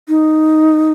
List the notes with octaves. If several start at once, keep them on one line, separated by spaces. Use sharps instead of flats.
D#4